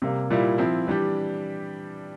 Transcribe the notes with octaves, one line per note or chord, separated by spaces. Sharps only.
C3 G3 A#3
A#2 G3 A#3 E4
F3 C4 E4
E3 G3 D4 G4